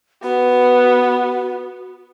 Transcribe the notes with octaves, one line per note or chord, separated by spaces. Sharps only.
B3 F#4